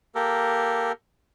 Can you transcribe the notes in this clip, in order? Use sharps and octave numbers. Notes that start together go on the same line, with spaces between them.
A#3 G4 A4 A#4